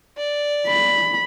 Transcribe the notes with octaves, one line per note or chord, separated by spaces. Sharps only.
D5
B5